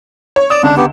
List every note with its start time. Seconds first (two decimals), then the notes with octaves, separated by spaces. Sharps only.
0.36 C#5
0.50 D5 D#6 E7
0.63 C#2 D3 D4
0.77 B3 G4